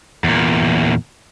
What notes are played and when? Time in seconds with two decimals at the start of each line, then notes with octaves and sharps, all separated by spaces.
0.24 E2 A#2